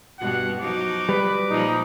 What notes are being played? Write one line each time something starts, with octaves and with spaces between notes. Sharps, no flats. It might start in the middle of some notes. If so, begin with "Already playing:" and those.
G2 B2 F#5
F3 F#3 D#4 D6
G3 B4
A#2 F3 A#3 D#4